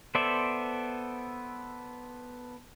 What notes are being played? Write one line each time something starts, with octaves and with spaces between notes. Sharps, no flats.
B3 A4 C5 D5 E5